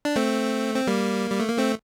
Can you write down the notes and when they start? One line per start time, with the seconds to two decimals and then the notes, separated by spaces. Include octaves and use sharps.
0.05 D4
0.16 A3 C4
0.75 C4
0.87 G3 A#3
1.30 G3
1.40 A3
1.49 A#3
1.58 A3 C4